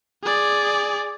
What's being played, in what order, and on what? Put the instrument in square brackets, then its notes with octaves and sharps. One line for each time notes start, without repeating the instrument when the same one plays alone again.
[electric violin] G#4 D5